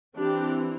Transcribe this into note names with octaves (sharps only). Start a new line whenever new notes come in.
E3 C4 D4 G4